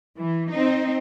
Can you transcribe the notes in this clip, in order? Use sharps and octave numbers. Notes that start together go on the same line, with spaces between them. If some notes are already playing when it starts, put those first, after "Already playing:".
E3
C4 D#4